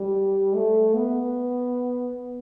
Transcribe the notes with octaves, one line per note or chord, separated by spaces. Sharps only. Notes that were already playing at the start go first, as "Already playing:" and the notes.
Already playing: G3
A3
B3